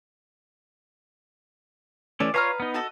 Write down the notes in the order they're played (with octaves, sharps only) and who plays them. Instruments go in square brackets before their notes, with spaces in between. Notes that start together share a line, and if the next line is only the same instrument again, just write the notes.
[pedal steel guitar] E3 A3 C#4 [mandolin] D5
[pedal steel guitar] F4 C#5 F5 [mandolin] B4 A#5 F6
[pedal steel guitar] B3 D#4
[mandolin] F#4 A4 D#5